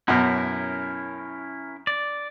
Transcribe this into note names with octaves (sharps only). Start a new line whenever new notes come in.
F#2 B2 C#4 E4 A#4
D5